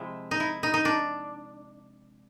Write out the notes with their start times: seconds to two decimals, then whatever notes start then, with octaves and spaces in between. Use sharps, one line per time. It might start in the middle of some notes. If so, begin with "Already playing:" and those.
Already playing: C3 F3 G#3 E4
0.31 D#4
0.40 E4
0.63 D#4
0.74 D#4
0.85 D4